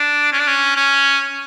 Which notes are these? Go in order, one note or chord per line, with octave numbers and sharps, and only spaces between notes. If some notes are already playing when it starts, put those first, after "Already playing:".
Already playing: D4
C#4
D4
C#4
C#4